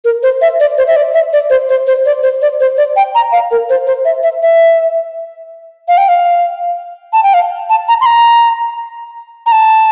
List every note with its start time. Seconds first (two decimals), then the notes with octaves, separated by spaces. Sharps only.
0.05 A#4
0.23 C5
0.42 E5
0.60 D5
0.78 C5
0.88 E5
0.96 D5
1.14 E5
1.33 D5
1.50 C5
1.69 C5
1.87 C5
2.06 D5
2.23 C5
2.42 D5
2.60 C5
2.77 D5
2.96 G5
3.15 A#5
3.32 F5
3.51 A#4
3.70 C5
3.87 C5
4.05 E5
4.23 E5
4.43 E5
5.88 F5
5.98 G5
6.09 F5
7.13 A5
7.23 G5
7.34 F5
7.70 A5
7.88 A#5
8.01 C6
8.06 A#5
9.46 A#5
9.52 A5